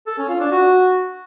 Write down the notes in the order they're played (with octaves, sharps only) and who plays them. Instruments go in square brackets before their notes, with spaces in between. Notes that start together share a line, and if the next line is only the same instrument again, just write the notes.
[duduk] A4
C#4
F4
D4
F#4